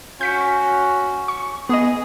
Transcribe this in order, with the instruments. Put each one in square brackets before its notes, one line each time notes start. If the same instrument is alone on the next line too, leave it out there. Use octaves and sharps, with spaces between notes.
[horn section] C#4 F#4 [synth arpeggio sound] G6 B6 C#7
[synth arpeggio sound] C#6
[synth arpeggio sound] B3 D#5 [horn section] G#4